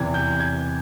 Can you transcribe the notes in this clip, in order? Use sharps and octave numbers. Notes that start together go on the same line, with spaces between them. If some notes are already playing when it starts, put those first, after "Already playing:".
Already playing: E2 C3 E3 G#6
G6
G#6